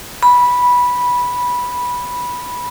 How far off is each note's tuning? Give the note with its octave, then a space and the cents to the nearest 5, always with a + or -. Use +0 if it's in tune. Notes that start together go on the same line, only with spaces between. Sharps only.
B5 -10